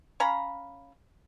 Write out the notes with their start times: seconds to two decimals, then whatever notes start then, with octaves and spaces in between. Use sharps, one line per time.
0.20 C#4 F5 A#5 B5